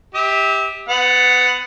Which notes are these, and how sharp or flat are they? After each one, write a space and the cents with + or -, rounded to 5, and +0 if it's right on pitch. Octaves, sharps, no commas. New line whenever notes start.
G4 +10 E5 -35
B3 +30 F#5 +0